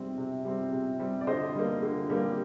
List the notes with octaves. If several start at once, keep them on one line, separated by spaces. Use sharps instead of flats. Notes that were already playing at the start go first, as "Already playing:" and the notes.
Already playing: C3 G3 C4
C3
G3 C4
C3
G3 C4
D5
D3 C5 D#5
G3 A#3
D3
G3 A#3